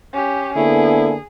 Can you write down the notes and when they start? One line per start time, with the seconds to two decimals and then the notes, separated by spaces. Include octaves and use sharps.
0.14 C#4 G4
0.56 D3 A#3 B3 E4 G#4